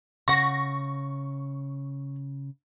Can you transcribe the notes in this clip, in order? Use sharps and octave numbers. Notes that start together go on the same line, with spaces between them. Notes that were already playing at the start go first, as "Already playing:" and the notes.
C#3 F#5 C#6 A#6